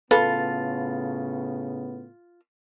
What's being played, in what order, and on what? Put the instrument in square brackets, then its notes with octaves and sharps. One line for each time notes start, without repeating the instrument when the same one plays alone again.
[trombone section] A2 C#3 B3 [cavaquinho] F4 [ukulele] A4 [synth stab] B4